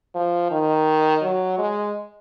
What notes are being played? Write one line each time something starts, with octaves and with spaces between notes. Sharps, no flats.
F3
D#3
F#3
G#3